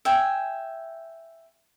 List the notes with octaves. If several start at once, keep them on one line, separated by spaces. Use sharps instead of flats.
E5 G5 G#5